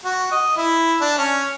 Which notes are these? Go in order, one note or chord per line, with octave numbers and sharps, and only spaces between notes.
F#4
D#5
E4
D4
C#4